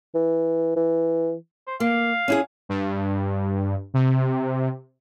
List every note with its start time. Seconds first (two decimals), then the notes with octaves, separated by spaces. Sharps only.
0.15 E3
0.76 E3
1.67 C5
1.80 A#3 F5
2.28 C#4 E4 G#4
2.69 G2
3.94 C3